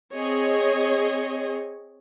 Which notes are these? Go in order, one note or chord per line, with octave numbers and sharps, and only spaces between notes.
C4 G#4 C#5 D#5